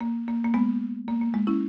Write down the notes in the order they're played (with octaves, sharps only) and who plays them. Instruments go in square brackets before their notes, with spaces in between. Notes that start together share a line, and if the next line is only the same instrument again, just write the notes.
[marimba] A#3
A#3
A#3
G#3 B3
A#3
A#3
G#3
C#4 E4